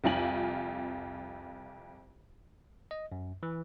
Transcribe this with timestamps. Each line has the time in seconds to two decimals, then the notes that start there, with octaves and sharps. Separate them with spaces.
0.04 C2 F2 C4 F4 G#5 F#7
2.91 D#5
3.12 F#2
3.43 E3